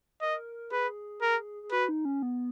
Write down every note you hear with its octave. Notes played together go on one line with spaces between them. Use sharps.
A#4 D#5
G#4 B4
A#4
G#4
F#4 B4
D#4
C#4
B3